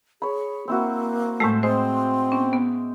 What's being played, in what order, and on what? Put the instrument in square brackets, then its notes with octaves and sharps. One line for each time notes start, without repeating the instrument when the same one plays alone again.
[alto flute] G#4 [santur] C#5 B5
[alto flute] A#3 [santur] C4 E4 F#4
[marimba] A2 G#3 A3 [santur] A4 C5
[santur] G#3 [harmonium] C4 [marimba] C5 [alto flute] C6
[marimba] B3 C#4
B3